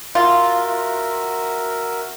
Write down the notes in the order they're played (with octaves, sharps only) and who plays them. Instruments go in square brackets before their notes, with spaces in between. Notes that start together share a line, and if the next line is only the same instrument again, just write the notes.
[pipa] F4 [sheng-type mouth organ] F#4 A#4 E5